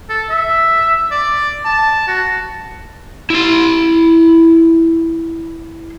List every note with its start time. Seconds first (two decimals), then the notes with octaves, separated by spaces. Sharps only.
0.09 A4
0.30 E5
1.11 D5
1.65 A5
2.08 F#4
3.30 E4 C6